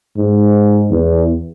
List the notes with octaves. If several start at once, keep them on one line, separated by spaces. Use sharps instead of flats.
G#2
E2